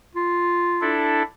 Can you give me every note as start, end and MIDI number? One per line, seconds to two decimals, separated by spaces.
0.15 0.96 65
0.81 1.22 62
0.81 1.22 64
0.81 1.22 69